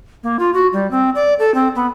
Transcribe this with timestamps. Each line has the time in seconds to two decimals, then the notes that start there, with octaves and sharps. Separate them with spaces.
0.23 A#3
0.39 F4
0.54 F#4
0.73 G3
0.91 C4
1.15 D5
1.39 A4
1.54 C4
1.75 B3